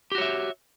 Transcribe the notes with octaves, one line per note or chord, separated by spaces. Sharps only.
F#4 G4 C#5 E5